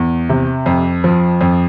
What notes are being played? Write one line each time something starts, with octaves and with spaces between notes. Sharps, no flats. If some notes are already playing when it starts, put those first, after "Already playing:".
Already playing: E2
C3
F2
F3
F2